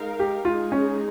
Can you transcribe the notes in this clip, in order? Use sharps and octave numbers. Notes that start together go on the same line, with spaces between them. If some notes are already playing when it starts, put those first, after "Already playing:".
Already playing: G#3 D#4 A#4 F5
G4
G#3 D#4 F4 G#4
C#4